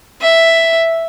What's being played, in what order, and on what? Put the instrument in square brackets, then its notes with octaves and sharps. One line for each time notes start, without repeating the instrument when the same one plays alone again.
[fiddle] E5